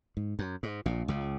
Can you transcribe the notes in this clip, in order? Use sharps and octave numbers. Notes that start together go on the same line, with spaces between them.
G#2
F#2
G#2
A#1 A#2
C#2 C#3